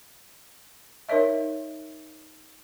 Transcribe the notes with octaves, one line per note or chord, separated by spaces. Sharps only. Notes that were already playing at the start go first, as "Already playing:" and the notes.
D#4 A#4 C#5 D#5 E5